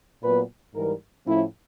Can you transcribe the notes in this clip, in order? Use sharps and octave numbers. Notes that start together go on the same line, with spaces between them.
A#2 F#3 B3 B4
G#2 E3 G3 A#4
A2 F3 A3 C#4 E4